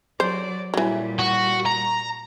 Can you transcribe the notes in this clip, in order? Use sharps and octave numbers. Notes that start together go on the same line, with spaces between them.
F#3 C5 D5
A#2 E3 F#3 G3
F#4
A#5